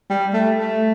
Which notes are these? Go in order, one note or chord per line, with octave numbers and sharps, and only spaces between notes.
G3
A3
A3